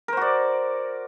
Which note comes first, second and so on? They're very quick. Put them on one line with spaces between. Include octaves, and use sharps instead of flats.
A#4 C5 F#4 D5